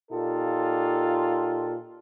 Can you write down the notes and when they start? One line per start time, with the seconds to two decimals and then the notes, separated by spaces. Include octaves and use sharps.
0.11 A#2 D#4 F4 G4 A4